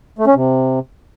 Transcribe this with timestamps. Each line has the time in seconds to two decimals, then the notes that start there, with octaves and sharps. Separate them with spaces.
0.19 A3
0.27 C#4
0.35 C3